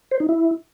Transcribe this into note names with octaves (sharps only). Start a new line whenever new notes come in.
C5
D#4
E4